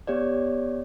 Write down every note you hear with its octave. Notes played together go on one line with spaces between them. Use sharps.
B3 G4 C#5 D5